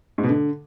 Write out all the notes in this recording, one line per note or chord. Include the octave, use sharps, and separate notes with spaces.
G#2
B2
D3